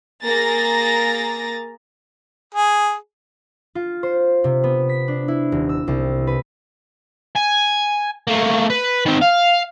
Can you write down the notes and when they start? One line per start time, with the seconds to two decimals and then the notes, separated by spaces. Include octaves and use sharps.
0.25 A#3 G#4 A#5 A6 A#6
2.55 G#4
3.75 F4
4.03 C5
4.44 C3
4.64 B3
4.89 B6
5.08 D4
5.28 E4
5.52 D#1
5.69 E6
5.88 C2
6.27 B4
7.36 G#5
8.28 A3 A#3
8.70 B4
9.06 D#3 C4
9.21 F5